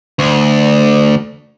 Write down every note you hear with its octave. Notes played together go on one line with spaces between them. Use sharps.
D2